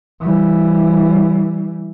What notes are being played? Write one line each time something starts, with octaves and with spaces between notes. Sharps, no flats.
E3 G3